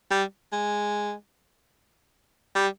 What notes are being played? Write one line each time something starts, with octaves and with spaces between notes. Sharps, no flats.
G3
G#3
G3